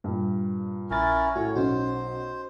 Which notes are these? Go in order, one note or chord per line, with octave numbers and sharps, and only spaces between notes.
G2 A#2
A#1 C#4 E4 A#4 A6
A2 F#4 C#5
B1 C#4 F#4 C5